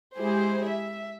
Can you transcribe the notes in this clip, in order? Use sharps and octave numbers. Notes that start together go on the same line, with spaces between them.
G#3 E4 G4 G#4 C5
E5